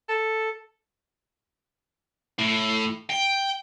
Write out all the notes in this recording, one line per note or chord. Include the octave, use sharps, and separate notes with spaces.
A4
A2
G5